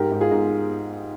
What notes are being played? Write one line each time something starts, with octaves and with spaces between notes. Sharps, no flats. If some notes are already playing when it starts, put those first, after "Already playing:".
Already playing: G#2 G4 A#4
G#2
F4 G#4
G#2